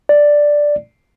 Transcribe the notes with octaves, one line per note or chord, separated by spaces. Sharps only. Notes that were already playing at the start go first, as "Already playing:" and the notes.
D5